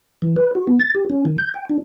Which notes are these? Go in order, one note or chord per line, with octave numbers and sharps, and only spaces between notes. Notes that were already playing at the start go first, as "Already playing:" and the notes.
E3
B4
F#4
B3
A6
G4
C#4
D#3
G6
G5
D4